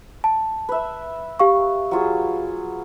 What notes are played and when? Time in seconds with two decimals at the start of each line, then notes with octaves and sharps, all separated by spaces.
0.24 A5
0.69 B4 E5
1.39 G4 F5 C#6
1.91 F#3 F4 G#4